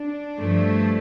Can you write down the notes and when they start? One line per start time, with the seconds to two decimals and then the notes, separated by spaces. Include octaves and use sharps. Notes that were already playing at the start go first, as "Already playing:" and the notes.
Already playing: D4
0.40 G2 F3 A3